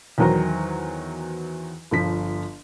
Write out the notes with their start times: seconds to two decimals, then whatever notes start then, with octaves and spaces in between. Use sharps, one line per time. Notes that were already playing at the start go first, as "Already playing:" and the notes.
0.18 E2 D#3 F#3 C5 A#5
1.91 G1 F3 B6